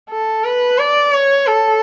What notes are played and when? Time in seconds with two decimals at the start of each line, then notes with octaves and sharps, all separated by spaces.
0.10 A4
0.44 B4
0.78 D5
1.12 C#5
1.47 A4